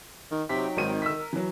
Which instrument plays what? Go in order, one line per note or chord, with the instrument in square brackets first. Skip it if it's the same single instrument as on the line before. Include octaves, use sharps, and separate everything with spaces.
[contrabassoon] D#3
[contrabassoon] C3 [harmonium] F#3 D#4 G5 [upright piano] B6
[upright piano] G#1 C4 D#7 [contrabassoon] D#3
[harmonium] D3 E5 [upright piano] E6 B6
[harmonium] A#4
[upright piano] E3 F#3